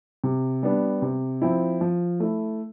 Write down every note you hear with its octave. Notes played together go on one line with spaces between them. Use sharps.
C3
G3 B3 D4
C3
F3 C4 E4
F3
A3 E4